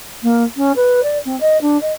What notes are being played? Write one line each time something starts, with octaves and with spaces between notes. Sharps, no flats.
A#3
C#4
B4
D5
C4
D#5
D4
D#5